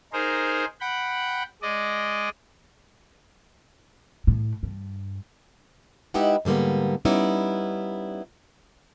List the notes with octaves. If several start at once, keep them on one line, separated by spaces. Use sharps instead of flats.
D#4 G#4 A#4 C5
F#5 G5 B5
G#3 D5 D#5
A2
G2
G#3 D#4 E4 G4 B4 F#5
G#2 D3 G3 A#3 B3
G3 B3 C#4 D#4 E4 D5